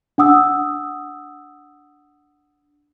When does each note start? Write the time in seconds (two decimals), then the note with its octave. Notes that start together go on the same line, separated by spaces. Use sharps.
0.18 D4 F#5 D#6 E6